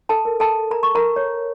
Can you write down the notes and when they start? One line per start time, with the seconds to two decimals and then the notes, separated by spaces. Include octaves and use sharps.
0.09 A4 A5
0.25 A#4
0.40 A4 A5
0.71 A#4 A#5
0.83 C#6
0.95 A#4 A#5
1.16 C#5